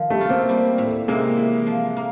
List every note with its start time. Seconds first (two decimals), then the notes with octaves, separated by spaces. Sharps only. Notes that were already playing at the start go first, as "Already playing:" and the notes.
Already playing: D#3 F3
0.10 G3 A3
0.21 F4
0.29 A#3 C4
0.49 G3
0.78 A2
1.08 C3 G#3 A#3
1.37 E3
1.67 F3
1.97 A#3